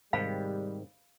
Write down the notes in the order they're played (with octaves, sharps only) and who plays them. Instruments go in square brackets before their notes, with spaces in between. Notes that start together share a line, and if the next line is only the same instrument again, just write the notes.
[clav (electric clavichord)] G#2 C3 D#3 [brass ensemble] G3 [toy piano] F5 B5